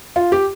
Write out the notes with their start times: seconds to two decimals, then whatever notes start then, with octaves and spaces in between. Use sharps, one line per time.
0.16 F4
0.32 G4